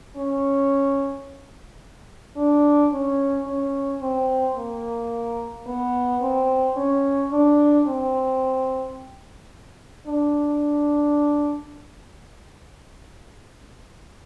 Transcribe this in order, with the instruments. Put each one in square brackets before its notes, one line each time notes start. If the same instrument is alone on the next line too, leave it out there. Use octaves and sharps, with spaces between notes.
[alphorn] C#4
D4
C#4
C#4
C4
A#3
B3
C4
C#4
D4
C4
D4